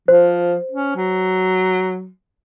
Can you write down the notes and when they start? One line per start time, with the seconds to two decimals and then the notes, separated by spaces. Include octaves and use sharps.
0.08 F3 C5
0.71 C#4
0.96 F#3